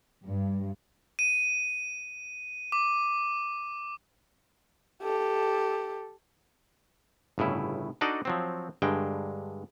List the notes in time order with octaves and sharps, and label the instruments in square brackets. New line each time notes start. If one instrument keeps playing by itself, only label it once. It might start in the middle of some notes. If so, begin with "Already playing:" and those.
[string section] G2
[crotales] D#7
D6
[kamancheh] G4 A4
[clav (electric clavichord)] G1 A2 C#3 E4
D4 D#4 F#4 A4 D5 D#5
F3 F#3 C4
G2 D3 G#3 G5